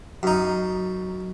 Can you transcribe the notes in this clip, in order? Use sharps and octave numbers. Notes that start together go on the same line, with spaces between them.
F#2 D#4